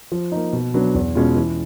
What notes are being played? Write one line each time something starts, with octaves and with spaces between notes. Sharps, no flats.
F3
A#3 D#4
B2
F#3 B3 D4
E2
B2 G#3 C#4 F4
E3